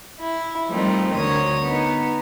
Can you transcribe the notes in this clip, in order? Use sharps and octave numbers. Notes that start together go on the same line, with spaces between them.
E4
F3 G3 A3 C4 D#4 A#4
D2 D3 A#4 C#5 D#6
B3 D#4